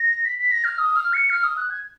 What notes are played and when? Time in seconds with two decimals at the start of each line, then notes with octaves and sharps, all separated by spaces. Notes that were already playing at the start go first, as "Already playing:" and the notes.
Already playing: A#6
0.25 B6
0.39 B6
0.52 A#6
0.64 F6
0.79 D#6
0.96 F6
1.13 C#7
1.30 F6
1.44 D#6
1.57 F#6
1.70 G#6